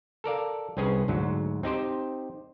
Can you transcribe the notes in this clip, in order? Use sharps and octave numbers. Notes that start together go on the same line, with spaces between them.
A4 A#4 D5 F5
C2 C4 C#4 G#4 B4
D2 G#2 F#3
C4 D#4 G4 C5